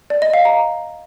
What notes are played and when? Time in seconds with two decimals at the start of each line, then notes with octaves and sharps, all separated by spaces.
0.10 D5
0.22 D#5
0.34 F5
0.45 A#5